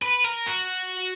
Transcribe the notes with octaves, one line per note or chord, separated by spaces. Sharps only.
B4
A#4
F#4